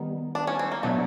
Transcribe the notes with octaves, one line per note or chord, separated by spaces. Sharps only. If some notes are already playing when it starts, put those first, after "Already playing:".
Already playing: D#3 G3 B3 D#4
D4
C#4
C4
A#3
B2 F#3 A3 B3 D4